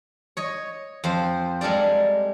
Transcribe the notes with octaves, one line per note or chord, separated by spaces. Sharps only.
C#5 D#5
F2 C5
G3 G#3 A4 A#4 D5